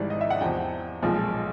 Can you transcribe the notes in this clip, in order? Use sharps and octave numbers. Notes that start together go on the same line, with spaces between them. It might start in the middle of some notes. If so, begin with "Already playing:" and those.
Already playing: G#1 G#2 E3 G3 D5
D#5
E5
F#5
E2 C3 F3 G5
B1 A#2 F3 G#3 C4